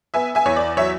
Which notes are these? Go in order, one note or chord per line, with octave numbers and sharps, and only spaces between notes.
B3 E5 G#5
E5 G#5
E2 C#5
D5
F#3 C#5 E5